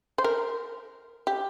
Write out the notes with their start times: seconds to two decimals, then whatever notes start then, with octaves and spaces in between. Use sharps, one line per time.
0.18 C5
0.24 A#4
1.27 G4